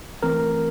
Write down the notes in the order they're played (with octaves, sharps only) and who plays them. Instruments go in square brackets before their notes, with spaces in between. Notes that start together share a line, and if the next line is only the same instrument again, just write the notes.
[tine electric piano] E3 A3 C4 A#4